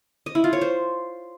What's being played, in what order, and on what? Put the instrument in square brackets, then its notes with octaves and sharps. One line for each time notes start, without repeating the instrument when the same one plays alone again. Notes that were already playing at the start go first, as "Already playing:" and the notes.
[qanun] D#5
E4
F4
C#5
C5